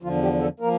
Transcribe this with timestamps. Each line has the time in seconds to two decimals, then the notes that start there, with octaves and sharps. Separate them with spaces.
0.02 E2 D3 F3 F4
0.22 G4
0.40 A4
0.60 F3 A#3 A#4